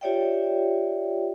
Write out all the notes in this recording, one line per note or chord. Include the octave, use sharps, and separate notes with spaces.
F4 G4 C#5 D5 E5 G5